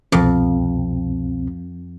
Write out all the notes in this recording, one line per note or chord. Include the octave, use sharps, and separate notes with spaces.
C2 F2 B2 C4